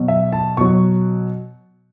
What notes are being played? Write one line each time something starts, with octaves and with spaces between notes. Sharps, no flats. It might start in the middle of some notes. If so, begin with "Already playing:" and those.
Already playing: B2 F#3
E5
A5
B2 F#3 C#6